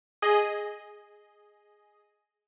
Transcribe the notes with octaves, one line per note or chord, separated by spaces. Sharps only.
G#4 D#5